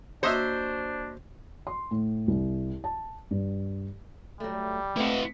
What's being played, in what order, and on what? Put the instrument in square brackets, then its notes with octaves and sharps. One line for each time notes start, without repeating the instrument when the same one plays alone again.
[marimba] A#3 F#4 [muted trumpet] D4 [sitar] C5 [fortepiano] C#5 D#5 E5
[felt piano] C6
A2
C2
A5
G2
[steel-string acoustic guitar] F#3 A3 [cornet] G3
[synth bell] A3 C4 [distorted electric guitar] E4 F#4 [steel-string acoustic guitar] B4 D#5